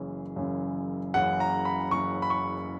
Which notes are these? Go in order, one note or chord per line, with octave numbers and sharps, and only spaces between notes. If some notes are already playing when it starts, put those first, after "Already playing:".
Already playing: F#1 F#2 C#3 E3
F#1 F#2 C#3 E3
F#1 F#2 C#3 E3 F#5
A#5
B5
F#1 F#2 C#3 E3 C#6
B5
C#6